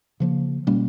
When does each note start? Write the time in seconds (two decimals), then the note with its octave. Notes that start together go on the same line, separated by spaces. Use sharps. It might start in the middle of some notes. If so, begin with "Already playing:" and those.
0.20 C#3 F3 A#3
0.67 B2 G3 A#3 C#4